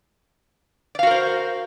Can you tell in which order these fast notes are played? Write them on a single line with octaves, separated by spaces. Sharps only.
D5 F5 F#4 A#4 C5